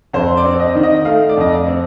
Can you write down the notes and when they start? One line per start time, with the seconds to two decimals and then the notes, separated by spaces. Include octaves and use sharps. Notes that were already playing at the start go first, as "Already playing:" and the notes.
0.13 F2 C5
0.37 D5
0.45 C4
0.60 D#5
0.75 D#3
0.83 D#5
1.05 A3 F5
1.29 D5
1.37 F2 D#5
1.52 D5
1.67 C4